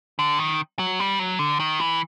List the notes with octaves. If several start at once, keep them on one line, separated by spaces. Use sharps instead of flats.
D3
D#3
F#3
G3
F#3
D3
D#3
E3